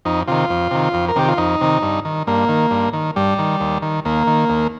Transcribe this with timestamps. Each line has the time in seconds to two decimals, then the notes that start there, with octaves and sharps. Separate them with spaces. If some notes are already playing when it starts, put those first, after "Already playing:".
0.05 F2 D#4
0.28 C3 D#3 F4
0.50 F2
0.71 C3 D#3
0.94 F2
1.08 A#4
1.16 C3 D#3 G4
1.28 F4
1.38 F2 D#4
1.61 C3 D#3
1.82 G2
2.05 D#3
2.27 G2 A#3
2.49 D#3
2.71 G2
2.93 D#3
3.16 G2 G3
3.39 D#3
3.60 D#2
3.82 D#3
4.05 D#2 A#3
4.27 D#3
4.50 D#2